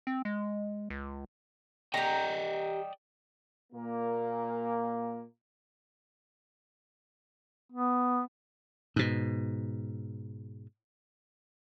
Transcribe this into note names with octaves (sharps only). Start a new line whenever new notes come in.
C4
G#3
C#2
G4 D5 D#5 G5 A#5
A#2 A#3
B3
G#2 B2